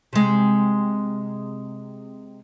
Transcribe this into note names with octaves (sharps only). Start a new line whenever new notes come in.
C3 G#3